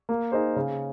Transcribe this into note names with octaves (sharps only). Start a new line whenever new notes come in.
A#3
D#4 G#4 C5
C#3